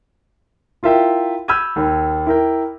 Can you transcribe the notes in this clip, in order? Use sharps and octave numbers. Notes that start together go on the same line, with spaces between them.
E4 F4 A#4 E5 G5
B5 E6 F6 G6 G#6 D#7
D#2
E4 A#4 G5